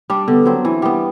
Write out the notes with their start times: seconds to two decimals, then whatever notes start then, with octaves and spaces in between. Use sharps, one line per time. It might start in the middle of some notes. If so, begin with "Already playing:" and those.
0.10 G3 D4
0.28 D3 B3
0.46 F#3 C4
0.65 E3
0.82 G3 B3